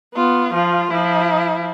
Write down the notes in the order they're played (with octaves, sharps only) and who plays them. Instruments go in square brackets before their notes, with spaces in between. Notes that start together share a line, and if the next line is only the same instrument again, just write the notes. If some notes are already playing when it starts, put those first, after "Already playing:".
[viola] B3 [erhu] F4
[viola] F3 [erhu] F4
[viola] F3 [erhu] E4